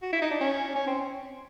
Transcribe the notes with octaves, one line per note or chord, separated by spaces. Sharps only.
F#4
E4
D#4
D4
C#4
C#4
C4